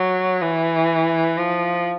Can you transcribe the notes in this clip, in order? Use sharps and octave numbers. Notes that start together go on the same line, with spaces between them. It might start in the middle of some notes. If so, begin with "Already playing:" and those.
Already playing: F#3
E3
F3